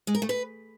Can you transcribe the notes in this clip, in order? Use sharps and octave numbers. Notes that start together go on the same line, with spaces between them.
G#3
A#4
A3
B4